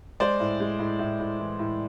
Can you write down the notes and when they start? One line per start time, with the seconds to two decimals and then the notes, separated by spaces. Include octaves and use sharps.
0.20 G#3 C5 D5
0.40 A2
0.60 G#3
0.79 A2
0.99 A2
1.20 A2
1.39 E3
1.59 A2